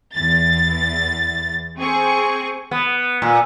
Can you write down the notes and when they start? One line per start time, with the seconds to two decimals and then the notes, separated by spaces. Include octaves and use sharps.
0.15 E2 A6
1.79 C4 G#4 C#6
2.71 B3
3.22 A#2